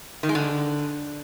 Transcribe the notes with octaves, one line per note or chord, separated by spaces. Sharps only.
D#3
G#3
D3